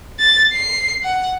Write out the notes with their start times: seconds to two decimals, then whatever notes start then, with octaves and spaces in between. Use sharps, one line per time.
0.19 A6
0.53 C7
1.03 F#5